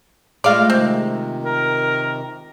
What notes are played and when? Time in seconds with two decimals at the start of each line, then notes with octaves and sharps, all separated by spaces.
0.44 G#3 A3 F4 D5 F5
0.70 C3 D#3 C4
1.45 A#4